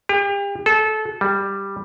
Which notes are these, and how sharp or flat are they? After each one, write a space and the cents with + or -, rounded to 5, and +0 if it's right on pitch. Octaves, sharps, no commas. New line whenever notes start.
G4 +40
A4 -25
G3 +5